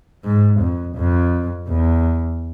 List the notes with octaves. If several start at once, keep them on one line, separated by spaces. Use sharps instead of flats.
G#2
F2
F2
E2